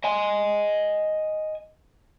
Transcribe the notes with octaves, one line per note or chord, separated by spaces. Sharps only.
D#5 G#5